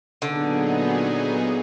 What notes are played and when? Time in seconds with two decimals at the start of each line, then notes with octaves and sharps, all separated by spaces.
0.21 A#2 D3 F#3 B3 D#4 G#4